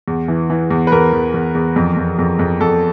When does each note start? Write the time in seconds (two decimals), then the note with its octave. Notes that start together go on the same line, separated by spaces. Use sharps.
0.08 E2
0.28 E3
0.50 E3
0.71 E2
0.87 B4
0.92 E2 A#4
1.13 E2
1.34 E2
1.55 E2
1.76 F2
1.97 F2
2.19 F2
2.39 F2
2.61 F2 A4